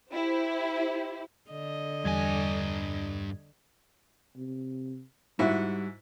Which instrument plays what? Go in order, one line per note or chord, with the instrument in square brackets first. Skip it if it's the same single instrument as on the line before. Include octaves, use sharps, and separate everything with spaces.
[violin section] E4 G4 C5
[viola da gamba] D3 D#5
[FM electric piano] E2 G3 G#6 [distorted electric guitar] G2 G#5
[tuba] C3
[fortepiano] G#2 E4 F#4 [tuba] G3